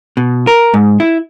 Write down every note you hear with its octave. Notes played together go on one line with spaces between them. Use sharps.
B2
A#4
G#2
E4